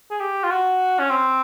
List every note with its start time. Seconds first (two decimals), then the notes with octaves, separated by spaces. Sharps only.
0.11 G#4
0.21 G4
0.44 F4
0.51 F#4
1.00 C#4
1.10 C4